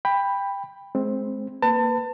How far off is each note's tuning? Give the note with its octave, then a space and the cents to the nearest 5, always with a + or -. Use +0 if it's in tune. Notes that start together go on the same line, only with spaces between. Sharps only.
G5 +20 B5 +0
G#3 +30 C4 +5
A#3 +0 B4 +15 A5 +30